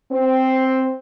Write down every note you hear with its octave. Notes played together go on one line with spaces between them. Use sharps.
C4